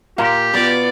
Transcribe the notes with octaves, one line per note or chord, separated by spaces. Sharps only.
A#2 G4 F5 A#5 C6
B2 B3 F4 D5